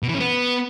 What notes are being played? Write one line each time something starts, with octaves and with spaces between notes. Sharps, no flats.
B2
E3
C#4
B3